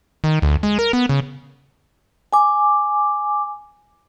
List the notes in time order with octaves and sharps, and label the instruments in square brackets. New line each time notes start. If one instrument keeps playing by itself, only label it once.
[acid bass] D#3
D2
G#3
A#4
B3
C#3
[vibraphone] G#5 D6